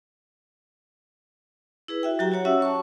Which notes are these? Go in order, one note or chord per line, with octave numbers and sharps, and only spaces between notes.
E4 G#4 B4
F#4 E5 G5
F#3 F#4 G4 G5 A#5
F#4 G4 C#5 F#5
C#4 F#4 C#5 E5 F#5 E6
A5 C#6